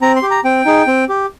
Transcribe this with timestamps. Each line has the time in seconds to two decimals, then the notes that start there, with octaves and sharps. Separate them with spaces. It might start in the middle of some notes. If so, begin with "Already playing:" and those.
0.01 C4 A#5
0.16 C6
0.23 G4
0.31 A#5
0.44 C4 G5
0.65 D#4 G#4
0.87 C4
1.09 G4